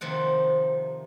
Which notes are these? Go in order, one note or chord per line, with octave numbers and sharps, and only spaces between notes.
C3 D#3 F3 F#5